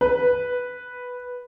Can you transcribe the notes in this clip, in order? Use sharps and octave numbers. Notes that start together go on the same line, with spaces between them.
B4